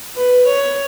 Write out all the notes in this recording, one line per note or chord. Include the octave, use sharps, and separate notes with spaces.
B4
C#5